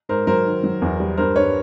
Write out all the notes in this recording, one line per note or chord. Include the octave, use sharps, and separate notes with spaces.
G#2 A#4 C5
F#3 A#4 C5
D#3
F#3
E2
G3
G2 A#4 C5
G2 B4 C#5